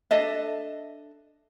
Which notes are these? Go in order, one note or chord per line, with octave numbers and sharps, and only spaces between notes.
D4 A4 D#5 E5